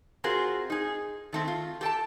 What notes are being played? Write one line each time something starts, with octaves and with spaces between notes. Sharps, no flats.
C4 F4 F#4 G#4 A#4 C5
D#4 G#4
D#3 A3 C4
F4
G4 A4 G5 A5